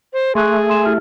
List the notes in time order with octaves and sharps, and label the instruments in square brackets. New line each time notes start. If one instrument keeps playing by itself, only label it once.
[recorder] C5
[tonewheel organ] A3 [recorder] G#4 [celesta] C6 C#6 F#6
[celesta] G#5 C6 E7
E4 G4 F6